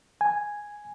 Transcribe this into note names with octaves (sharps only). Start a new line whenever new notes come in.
G#5